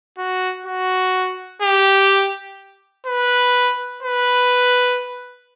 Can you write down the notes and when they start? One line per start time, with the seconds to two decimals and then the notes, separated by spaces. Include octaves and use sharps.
0.18 F#4
0.66 F#4
1.62 G4
3.07 B4
4.03 B4